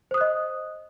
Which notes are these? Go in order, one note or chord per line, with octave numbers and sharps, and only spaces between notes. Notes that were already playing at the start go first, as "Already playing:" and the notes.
C5 D#5 D#6 F#6